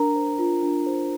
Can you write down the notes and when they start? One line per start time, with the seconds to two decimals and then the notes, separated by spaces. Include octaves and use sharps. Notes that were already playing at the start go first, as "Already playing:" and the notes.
Already playing: D4 A#4 A#5
0.16 C5
0.39 F4
0.63 D4
0.86 C5